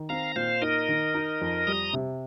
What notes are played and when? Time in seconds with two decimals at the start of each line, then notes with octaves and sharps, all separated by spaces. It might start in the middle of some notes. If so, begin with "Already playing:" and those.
Already playing: D#3
0.09 C4 F5 A#5
0.36 A#2 C5 F5
0.62 D#4 A#4 D#5
0.89 D#3
1.14 D#4
1.41 F2
1.67 G3 A#5 D#6
1.93 C3